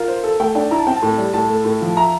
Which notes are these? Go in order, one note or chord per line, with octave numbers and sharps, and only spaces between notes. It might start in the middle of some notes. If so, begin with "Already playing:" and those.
Already playing: F4 A#4
C5
A4
A3 G5
D4 G5
E4 A#5
A5
C4 G5
A5
A2
G3
A2 A5
A3
A2
F3
E5 A#5